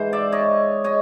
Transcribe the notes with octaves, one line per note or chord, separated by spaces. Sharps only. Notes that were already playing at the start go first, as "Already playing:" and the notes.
Already playing: G#2 E3 G#3 C5
D5 E5
C#5 D#5
C#5 D#5